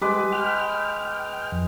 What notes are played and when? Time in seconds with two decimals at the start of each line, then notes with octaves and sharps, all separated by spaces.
0.01 G3 G#3 G4 B4 D6
0.32 G5 F6
1.52 F2